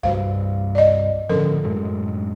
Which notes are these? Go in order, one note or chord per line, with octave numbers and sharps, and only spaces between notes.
C2 G2 G3 F#4 C5 F5
D5 D#5
A2 D3 F3 C#4 A4 A#4
F#2 A2 G#3